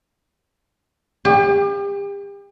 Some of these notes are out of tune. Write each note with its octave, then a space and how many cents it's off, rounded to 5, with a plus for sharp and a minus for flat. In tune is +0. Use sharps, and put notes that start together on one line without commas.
G4 +35